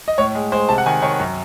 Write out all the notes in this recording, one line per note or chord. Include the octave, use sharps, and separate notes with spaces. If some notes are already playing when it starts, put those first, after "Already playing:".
D#5
A2 C#5
G#3
G#3 C5
C3 A5
F#5
D#3 G#5
D#3 C#5
F#2